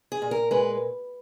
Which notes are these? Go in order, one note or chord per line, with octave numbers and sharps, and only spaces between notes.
G#4
A#2
A#4
G#3 B4